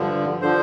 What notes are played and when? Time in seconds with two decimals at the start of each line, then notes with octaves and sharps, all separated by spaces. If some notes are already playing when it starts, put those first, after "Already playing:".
Already playing: G2 D3 F3
0.42 D3 F3 C5